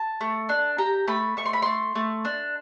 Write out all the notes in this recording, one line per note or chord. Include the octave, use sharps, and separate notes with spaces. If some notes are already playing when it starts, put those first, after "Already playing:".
Already playing: A5
A3
D4
G4 A#5
A3 B5
A3 C#6
C6
B5
A3 C6
A3
D4